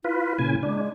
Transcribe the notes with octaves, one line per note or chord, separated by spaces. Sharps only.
E4 F4 B4
A#2 C#3 G#5
G#3 D4